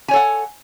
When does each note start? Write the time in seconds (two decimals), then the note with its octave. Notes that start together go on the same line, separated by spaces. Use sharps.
0.08 G#5
0.11 C#5
0.13 A4
0.16 F#5